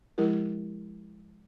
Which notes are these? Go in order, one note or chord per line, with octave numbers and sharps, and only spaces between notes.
F3 G#3 E4 G4 A#4